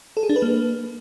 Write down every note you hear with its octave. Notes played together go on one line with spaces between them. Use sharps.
A4
G#4
D4
B4
A#3